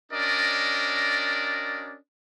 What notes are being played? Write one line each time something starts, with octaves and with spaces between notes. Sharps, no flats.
C#4 D4 F#4 A#4 D5 D#5